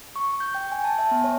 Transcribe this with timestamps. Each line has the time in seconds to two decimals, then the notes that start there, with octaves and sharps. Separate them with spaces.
0.16 C#6
0.40 G6
0.55 G5
0.72 G#5
0.84 A5
0.98 E5
1.11 B3
1.24 C#5